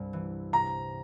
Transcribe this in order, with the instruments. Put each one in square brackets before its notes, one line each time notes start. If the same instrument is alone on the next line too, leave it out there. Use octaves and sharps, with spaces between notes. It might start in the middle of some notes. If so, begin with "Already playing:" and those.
Already playing: [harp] C2 G2
E3
[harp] C3 [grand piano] A#5